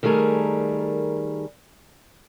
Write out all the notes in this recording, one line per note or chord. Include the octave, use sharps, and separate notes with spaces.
D#3 G3 A3 G#4 A#4